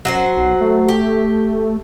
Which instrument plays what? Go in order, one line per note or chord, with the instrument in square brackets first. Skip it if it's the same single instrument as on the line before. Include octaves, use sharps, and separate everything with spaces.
[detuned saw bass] F#2 [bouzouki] F#3 F#4 C5
[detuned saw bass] B1
A3
[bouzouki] G4